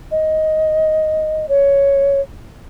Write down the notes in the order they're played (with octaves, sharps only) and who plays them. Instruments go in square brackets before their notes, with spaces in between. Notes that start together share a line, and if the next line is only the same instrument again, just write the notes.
[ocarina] D#5
C#5